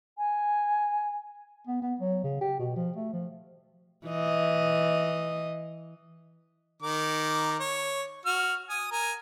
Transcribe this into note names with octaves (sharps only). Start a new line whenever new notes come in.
G#5
B3
B3
F#3
C#3
G4
B2
F3
A3
F3
E3 D#5
D#3 A#4 D6
C#5
F#4 F6
G#5 D#6
A#4 G#5